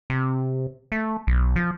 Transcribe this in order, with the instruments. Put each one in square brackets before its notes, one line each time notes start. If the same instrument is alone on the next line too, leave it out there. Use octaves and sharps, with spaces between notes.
[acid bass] C3
A3
B1
F3